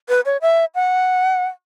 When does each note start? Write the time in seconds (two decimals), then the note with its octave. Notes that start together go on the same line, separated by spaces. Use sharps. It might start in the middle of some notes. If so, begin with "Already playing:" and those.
0.09 B4
0.26 C#5
0.42 E5
0.75 F#5